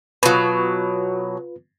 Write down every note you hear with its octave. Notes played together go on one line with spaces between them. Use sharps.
B2 F#3 F4 B4